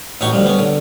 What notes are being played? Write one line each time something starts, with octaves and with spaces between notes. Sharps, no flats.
A1 A2 C#4 D#4 F#4 C#6
D2 F3 G3
B3 C#4
D3